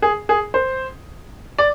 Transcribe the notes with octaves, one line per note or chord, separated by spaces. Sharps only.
G#4
G#4
C5
D5